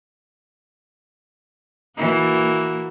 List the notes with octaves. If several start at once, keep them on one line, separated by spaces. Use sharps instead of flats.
E3 A#3 F#4